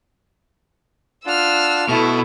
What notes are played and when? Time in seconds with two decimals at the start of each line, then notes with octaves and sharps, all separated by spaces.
1.26 D4 F4 F#5 A5 E6 F6
1.89 B2 A3 E4 A4